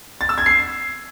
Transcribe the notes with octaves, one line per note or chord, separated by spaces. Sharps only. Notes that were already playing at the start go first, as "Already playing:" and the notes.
A6
E6
G#6
C7